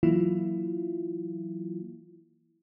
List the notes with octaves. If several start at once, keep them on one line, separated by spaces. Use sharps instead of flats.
E3 F#3 A#3 E4 F4